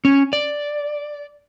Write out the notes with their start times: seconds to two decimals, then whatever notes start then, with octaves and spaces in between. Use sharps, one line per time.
0.05 C#4
0.33 D5